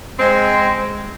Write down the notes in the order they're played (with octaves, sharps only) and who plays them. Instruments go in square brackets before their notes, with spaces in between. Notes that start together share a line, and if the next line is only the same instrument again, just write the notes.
[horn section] G#3 C4